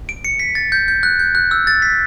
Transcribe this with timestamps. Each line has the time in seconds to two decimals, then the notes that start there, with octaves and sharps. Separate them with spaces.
0.09 D7
0.25 C#7
0.39 B6
0.55 A6
0.72 G6
0.88 G6
1.03 F#6
1.19 G6
1.35 F#6
1.51 E6
1.67 A6
1.82 B6